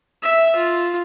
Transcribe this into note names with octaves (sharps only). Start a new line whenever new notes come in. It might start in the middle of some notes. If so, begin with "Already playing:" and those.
E5
F4